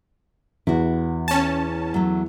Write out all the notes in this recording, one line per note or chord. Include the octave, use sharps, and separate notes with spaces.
E2 E4 F#4
C#4 A5
F#3 A3